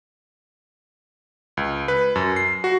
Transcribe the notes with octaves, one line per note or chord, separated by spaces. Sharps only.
C#2
B4
F#2
C7
F#4